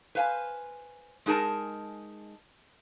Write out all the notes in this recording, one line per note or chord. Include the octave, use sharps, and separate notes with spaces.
B4 C5 F5 G5 G#5
G#3 D#4 G#4 A#4 A5